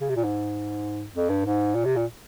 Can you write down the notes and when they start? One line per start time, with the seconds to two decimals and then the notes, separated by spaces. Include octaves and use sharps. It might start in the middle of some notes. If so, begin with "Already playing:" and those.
0.01 C#3
0.09 C3
0.16 A#2
0.24 G#2
1.15 F2
1.29 G2
1.45 G#2
1.75 A#2
1.85 C3
1.96 A#2